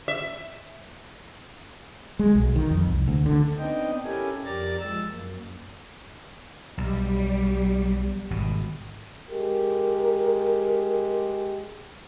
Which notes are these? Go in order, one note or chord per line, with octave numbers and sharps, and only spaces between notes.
E5
G#3
B1
D#3
F2
C2
D2
D3
B3 C4 D4 D#4 D#5 G5
C#4 E4 G4 A4 A#4 G#5
F2 G4 A#4 D5 A#5 A6
F3 G#3 E6 A6
F#2 A#3
B1 G3
G#1 B2
G#3 G4 A#4